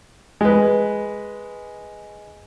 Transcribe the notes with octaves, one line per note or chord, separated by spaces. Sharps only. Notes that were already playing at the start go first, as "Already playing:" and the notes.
G#3 B4